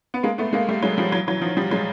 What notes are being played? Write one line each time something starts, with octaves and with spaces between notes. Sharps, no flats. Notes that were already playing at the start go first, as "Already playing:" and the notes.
B3
G#3 A#3
A3 B3
G#3 A#3
G3 A3
F#3 G#3
F3 G3
E3 F#3
E3 F#3
D#3 F3
F3 G3
F#3 G#3